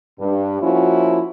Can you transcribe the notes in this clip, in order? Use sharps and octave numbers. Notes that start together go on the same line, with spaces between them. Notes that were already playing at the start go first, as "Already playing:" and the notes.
G2
F3 A#3 C#4 E4 F#4